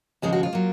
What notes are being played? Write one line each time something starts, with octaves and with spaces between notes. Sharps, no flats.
D#2 C#3 F3 G#3 G#4
F#4
F4
F#3 A#3